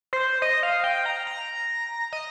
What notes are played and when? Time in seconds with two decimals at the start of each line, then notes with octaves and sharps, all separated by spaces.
0.13 C5
0.42 D#5
0.63 F5
0.84 G5
1.06 A#5
1.27 A#5
2.13 D#5